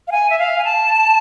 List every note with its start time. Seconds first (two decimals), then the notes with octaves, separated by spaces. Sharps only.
0.08 F5
0.12 G#5
0.30 E5
0.39 F5
0.58 G#5
0.65 A5